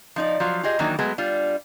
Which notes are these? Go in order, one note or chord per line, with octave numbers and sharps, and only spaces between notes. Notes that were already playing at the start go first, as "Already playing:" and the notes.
F3 D#4 D5
F3 F#3 F4
F4 G4 G#4 D#5
D#3 E3 F#3 A#3 D4 D#4
F#3 G#3 A3 B3
G3 D4 F4